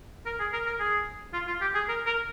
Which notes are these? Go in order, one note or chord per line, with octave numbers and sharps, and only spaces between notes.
A#4
G#4
A#4
A#4
G#4
F4
F4
G4
G#4
A#4
A#4